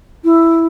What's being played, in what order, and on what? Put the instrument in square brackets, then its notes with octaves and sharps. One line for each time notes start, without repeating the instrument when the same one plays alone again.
[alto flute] E4